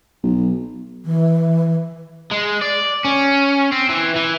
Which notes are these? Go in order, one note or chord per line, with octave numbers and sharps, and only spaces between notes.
B1
E3
G#3
D5
C#4
C4
E3
E3